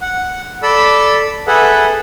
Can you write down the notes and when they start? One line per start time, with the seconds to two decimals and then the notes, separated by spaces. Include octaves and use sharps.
0.01 F#5
0.63 A4 D5 B5 E6
1.47 G#4 A4 B4 E5 F#5